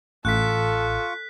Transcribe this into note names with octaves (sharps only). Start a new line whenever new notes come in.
A1 F4 A4 C#6 F#6 B6